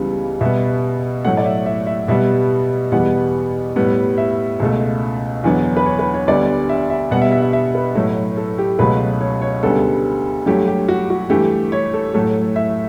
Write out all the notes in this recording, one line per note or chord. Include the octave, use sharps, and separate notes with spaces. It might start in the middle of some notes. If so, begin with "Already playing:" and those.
Already playing: C#2 C#3 E3 G3 B3
B2 G3 B3 E5
A2 F#3 A3 F#5
D5
E5
E5
E5
B2 G3 B3 E5
E2 B2 G3 B3 F#5
A2 G3 B3
E5
C#2 B2 A3
E2 D3 F#3 B3
B4
C#5
B4
C#5
D2 D3 G3 B3 D5
E5
E5
B2 G3 B3 F#5
E5
E5
E5
E5
B4
A2 F#3 A3
A4
G4
C#2 B2 F#3 A3 B4
C#5
C#5
D2 C#3 G3 B3 A4
G2 F#3 A3 G4
G4
F#4
F#4
G2 E3 A3 G4
C#5
A4
A2 F#3 A3 A4
E5